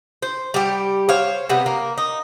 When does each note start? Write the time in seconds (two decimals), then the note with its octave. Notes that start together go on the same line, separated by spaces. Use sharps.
0.22 C5
0.54 G3 G4
1.09 C5 C#5 F5
1.49 C3 G3 B3
1.66 A#3
1.98 D#4